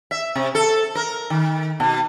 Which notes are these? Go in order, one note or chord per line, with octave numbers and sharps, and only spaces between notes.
E5
C3
A4
A#4
D#3
B2